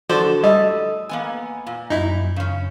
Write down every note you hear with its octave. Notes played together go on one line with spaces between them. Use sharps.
A2 D3 F3 F#4 A4 C5 D5
G3 D#5 D#6 E6
A#3 B3 G#5
A#2
F#2 D#4 E4
C#3 C#4